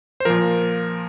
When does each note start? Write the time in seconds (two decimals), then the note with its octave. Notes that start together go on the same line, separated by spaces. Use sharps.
0.20 C5
0.25 A#2 F3 A#4